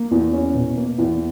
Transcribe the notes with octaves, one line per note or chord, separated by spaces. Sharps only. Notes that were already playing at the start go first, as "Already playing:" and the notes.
Already playing: A#3
E2
C#4
B2
A#3
E2